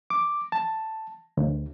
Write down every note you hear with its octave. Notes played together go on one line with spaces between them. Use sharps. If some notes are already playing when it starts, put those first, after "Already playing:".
D6
A5
D2